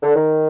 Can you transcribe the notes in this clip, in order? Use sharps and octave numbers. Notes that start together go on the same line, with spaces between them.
D3
D#3